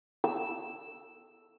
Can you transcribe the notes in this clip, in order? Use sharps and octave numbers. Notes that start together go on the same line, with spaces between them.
E6